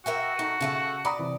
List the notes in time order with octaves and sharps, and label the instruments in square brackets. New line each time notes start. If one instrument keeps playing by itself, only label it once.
[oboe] F#4 [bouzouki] A#4 E5 G5
[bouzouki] A3 D#4
[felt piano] C#3 [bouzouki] A3 F5 A5
[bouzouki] D5 [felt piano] A#5 B5 D#6
[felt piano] C3 E3